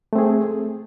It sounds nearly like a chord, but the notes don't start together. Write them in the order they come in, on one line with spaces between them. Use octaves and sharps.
A3 C4 G#4